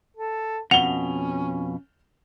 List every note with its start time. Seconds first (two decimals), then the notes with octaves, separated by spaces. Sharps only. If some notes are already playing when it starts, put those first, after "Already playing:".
0.17 A4
0.71 F2 B2 C#4 F#5 F7 G7